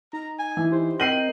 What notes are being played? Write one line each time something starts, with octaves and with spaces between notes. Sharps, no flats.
D#4 A#5
G#5
E3
D#4 G4 C5
C4 A#4 D#5 G5 C7 D#7 F#7